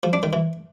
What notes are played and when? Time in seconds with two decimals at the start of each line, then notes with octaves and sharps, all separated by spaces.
0.03 F3
0.13 D4
0.23 D#3
0.33 E3